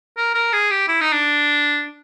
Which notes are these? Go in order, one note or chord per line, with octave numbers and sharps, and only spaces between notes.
A#4
A#4
G#4
G4
E4
D#4
D4